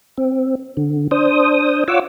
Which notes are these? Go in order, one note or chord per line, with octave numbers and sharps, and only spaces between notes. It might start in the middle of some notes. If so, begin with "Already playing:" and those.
C4
D3
D4 C5 D#6
F4 C#5 F#5 D6 E6